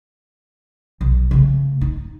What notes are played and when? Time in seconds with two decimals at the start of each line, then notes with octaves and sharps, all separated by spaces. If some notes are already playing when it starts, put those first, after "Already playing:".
1.01 B1
1.31 C#3 A3
1.81 D#4